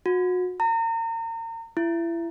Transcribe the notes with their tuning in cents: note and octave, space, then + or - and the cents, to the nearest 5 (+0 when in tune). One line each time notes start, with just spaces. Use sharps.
F#4 -30
A#5 -35
E4 +30